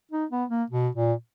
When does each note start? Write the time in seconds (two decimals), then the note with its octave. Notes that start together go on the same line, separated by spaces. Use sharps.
0.12 D#4
0.31 B3
0.50 A#3
0.70 B2
0.95 A#2